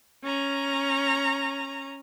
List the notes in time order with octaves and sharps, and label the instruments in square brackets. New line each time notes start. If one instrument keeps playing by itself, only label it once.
[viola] C#4 A#5